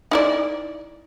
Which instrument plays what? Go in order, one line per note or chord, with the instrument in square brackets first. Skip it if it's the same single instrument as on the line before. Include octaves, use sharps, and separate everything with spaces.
[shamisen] D#4 E4 D5